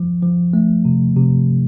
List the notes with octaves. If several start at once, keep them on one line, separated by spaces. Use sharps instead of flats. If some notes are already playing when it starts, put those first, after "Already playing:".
Already playing: F3
F3
A3
C3
C3